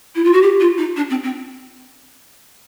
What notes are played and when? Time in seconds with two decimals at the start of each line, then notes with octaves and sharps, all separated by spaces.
0.15 E4
0.24 F4
0.33 F#4
0.42 G4
0.60 F4
0.78 D#4
0.96 D4
1.10 C4
1.23 C4